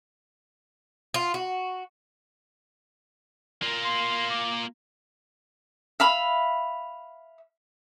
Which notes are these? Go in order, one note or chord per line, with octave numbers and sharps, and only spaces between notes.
F4
F#4
A#3 F4
C6
D6
E5 F5 B5